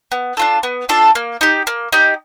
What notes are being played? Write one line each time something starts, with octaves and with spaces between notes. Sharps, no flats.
B3
D4 F4 A4
B3
D4 F4 A4
A#3
D#4 G4
A#3
D#4 G4